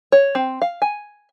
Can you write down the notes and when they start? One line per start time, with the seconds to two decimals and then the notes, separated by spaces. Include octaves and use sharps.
0.12 C#5
0.35 C4
0.62 F5
0.82 G#5